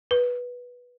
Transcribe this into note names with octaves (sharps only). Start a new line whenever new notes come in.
B4